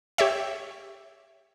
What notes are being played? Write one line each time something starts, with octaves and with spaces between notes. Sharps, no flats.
G4 C#5 E5